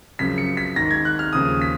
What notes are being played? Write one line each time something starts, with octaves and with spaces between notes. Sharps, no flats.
F#2 C#3 F3 B6
C#7
B6
G#2 D#3 A#6
G#6
F#6
F6
D#2 C#3 F3 D#6
B6